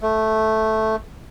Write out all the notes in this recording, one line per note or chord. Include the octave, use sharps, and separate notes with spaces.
A3